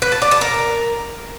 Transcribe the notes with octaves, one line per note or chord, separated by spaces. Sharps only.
B4
A5
D5
A5
A#4